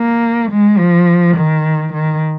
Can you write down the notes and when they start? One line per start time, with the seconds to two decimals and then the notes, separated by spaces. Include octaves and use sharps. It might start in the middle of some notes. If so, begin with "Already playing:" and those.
Already playing: A#3
0.51 G#3
0.79 F3
1.36 D#3
1.93 D#3